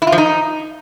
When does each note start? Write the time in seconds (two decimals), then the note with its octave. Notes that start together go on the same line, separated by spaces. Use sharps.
0.02 E4
0.07 F4
0.12 F3
0.18 D#4